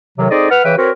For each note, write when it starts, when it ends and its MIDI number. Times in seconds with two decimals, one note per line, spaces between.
0.18 0.27 45
0.18 0.27 48
0.18 0.27 51
0.18 0.27 54
0.30 0.46 60
0.30 0.46 63
0.30 0.46 68
0.30 0.46 69
0.30 0.46 74
0.30 0.46 75
0.51 0.63 71
0.51 0.63 78
0.51 0.63 89
0.64 0.72 49
0.64 0.72 52
0.64 0.72 71
0.64 0.72 76
0.64 0.72 79
0.77 0.90 60
0.77 0.90 66
0.77 0.90 70
0.77 0.90 71
0.77 0.90 73